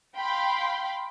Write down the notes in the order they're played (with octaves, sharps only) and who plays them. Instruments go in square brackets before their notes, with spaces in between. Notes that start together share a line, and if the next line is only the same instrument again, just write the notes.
[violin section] F5 G5 B5 C6